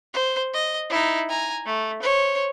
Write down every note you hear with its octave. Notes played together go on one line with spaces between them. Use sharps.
C5
D#5
D#4 E4
G#5 A#5
A3
C5 C#5